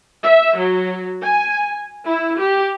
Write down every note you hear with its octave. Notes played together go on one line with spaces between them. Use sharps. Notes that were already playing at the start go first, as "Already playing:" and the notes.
E5
F#3
G#5
E4
G4